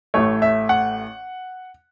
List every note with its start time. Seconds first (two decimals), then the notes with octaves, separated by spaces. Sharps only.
0.14 A1 A2 A3 C#5
0.42 E5
0.69 F#5